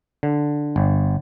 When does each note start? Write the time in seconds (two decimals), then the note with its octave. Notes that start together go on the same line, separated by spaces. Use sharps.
0.23 D3
0.76 G1